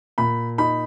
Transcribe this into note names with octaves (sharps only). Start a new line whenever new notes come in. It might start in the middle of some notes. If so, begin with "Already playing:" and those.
A#2 B5
D#4 B5